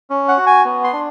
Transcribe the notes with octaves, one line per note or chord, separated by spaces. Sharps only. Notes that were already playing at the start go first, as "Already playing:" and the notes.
C#4
F#5
F#4
G#5
B3
C6
D4